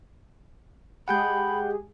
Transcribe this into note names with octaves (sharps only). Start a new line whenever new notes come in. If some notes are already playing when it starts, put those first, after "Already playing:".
G#3 G4 G#4 F#5 G5 B5 G6